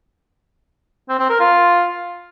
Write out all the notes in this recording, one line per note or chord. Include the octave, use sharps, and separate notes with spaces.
C4
C4
A#4
F4